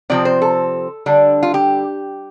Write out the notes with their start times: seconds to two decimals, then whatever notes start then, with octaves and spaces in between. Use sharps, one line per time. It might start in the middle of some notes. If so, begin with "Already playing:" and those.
0.10 C3 F3 C4 D5
0.25 C5
0.42 A4
1.06 D3 G3 D4
1.43 F4
1.54 G4